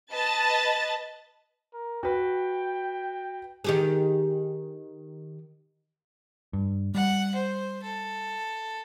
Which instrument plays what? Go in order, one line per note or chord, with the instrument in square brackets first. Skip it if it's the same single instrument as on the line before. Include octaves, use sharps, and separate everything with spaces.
[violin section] B4 D#5 A5 A6
[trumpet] A#4
[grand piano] F#4 B4 [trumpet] G5
[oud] D#3 G4 G#4
[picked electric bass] G2
[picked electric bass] G3 [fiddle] F#5
[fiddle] C5
A4